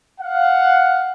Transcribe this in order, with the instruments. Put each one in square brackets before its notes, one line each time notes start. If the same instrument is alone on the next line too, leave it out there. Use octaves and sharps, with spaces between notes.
[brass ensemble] F5 F#5